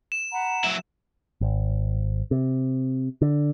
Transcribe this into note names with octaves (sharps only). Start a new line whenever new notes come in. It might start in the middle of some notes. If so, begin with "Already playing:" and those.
E7
F#5 A#5 B5
F#3 E4
G#1
C3
D3